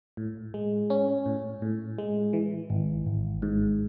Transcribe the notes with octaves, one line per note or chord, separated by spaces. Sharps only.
A2
G#3
C#4
A2
A2
G#3
E3
G#1
G#1
G#2